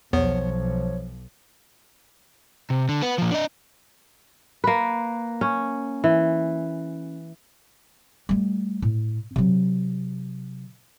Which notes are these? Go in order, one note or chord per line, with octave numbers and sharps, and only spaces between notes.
B1 E2 F3 B3 C#5
C3
D3
B4 F#5
A#2 F3
D4 D#5
A#3 B4
C#4
E3
G3 A3
A2
C3 F#3